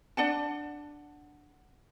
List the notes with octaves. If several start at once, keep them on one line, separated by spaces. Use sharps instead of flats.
D4 D5 F#5 A5